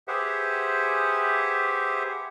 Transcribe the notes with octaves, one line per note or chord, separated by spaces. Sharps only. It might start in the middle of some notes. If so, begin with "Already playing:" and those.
G4 G#4 B4 C5 E5 F#5